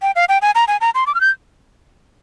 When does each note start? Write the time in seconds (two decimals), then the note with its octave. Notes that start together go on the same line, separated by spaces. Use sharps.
0.02 G5
0.16 F5
0.29 G5
0.42 G#5
0.55 A#5
0.68 G#5
0.81 A#5
0.95 C6
1.07 D6
1.15 F6
1.21 G6